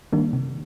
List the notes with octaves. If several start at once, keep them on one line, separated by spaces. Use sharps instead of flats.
D#3 G3 A#3 D4
C3